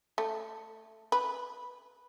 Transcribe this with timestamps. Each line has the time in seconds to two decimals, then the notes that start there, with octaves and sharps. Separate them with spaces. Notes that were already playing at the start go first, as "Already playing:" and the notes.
0.18 A3
1.12 B4